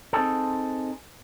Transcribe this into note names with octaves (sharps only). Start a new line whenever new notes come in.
C4 D#4 G#4 A4